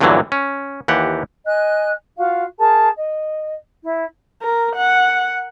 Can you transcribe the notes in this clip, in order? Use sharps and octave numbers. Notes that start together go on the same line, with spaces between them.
E2 G2 A#2 D3 E3 F#3
C#4
D#2 E3 G4 F#5
D#5 G#5 F#6
F4 F#4 F5
G#4 A#4 A5
D#5
E4
A#4
F#5